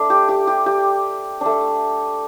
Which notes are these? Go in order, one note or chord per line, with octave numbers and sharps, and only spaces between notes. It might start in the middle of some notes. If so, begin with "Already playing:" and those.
Already playing: A3 D4
G4
G4
G4
G4
A3 D4